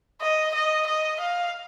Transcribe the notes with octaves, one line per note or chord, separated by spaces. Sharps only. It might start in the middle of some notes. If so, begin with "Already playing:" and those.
D#5
D#5
D#5
F5